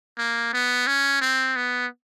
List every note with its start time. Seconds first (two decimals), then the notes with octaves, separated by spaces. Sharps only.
0.18 A#3
0.53 B3
0.87 C#4
1.22 C4
1.56 B3